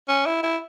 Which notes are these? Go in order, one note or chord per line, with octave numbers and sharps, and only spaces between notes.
C#4
E4
E4